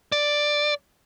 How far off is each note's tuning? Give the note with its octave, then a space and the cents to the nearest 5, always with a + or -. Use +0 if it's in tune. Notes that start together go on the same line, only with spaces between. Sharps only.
D5 +5